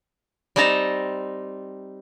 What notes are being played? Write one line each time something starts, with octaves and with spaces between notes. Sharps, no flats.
G3 C4 D#4 A5 A#5